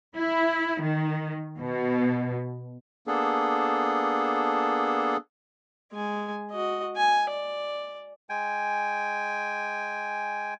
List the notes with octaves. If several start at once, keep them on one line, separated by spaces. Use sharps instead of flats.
E4
D#3
B2
A#3 B3 D4 G#4 A4
G#3 G#5
F#4 D#5
G#5
D5
G#3 G5 G#5